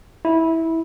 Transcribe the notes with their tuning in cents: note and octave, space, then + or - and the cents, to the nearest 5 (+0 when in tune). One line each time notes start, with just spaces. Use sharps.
E4 -15